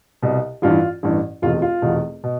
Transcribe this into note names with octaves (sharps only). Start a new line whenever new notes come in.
C2 B2
A1 G2 E3 F4
A1 G2 E3
F1 E2 B2 F4
F4
F1 E2 B2
B2